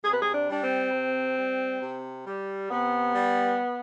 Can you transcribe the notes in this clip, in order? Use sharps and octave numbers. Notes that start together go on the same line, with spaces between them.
C3 G#4
B4
G#4
D4
G3 D4
C4
C3
G3
C3
G3
C3 B3
G3